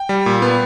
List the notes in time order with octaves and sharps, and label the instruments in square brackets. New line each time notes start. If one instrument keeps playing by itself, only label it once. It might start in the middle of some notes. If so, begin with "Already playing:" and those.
Already playing: [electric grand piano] G5
G3
A#2
B3